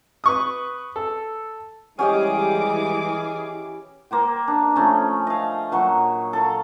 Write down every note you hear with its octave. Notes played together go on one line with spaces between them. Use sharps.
B4 C#6 D#6
A4
E3 G3 G#3 C#4 G4 G#4 D#5 D6
A#3 C5 G5
D4
F3 A3 C#4
D#5 F5
A#2 F#3 C#6
A4 F5